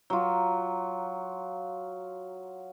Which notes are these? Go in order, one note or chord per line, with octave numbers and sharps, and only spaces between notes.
F#3 F4